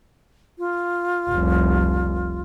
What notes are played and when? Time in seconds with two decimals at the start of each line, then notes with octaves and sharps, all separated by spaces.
0.59 F4
1.30 F1 C2